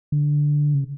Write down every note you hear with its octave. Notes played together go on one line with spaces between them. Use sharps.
D3
C#3